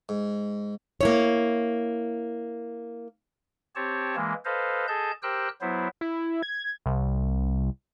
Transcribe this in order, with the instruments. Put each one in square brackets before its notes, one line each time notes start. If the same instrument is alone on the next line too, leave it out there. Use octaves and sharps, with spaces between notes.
[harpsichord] G#2
[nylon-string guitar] A#3 E4 C#5
[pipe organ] C4 G4 C#5 A5
E3 G#3 A#3
A4 B4 C5 D#5 F5
G#4 A4 D#5 A5 G6
G4 A#4 C5 G5 E6 F#6
F#3 B3 E4 C5
[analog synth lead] E4
G#6
[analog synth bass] C2